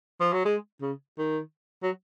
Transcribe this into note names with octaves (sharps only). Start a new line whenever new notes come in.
F3
F#3
G#3
C#3
D#3
F#3